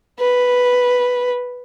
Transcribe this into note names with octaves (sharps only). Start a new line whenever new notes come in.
B4